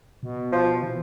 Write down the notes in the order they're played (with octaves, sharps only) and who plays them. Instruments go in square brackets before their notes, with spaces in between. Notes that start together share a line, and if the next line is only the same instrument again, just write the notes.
[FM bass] B2
[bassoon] F3
[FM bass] E3